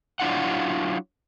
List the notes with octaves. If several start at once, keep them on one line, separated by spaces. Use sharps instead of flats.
F#3 D4 E4 F4 F#5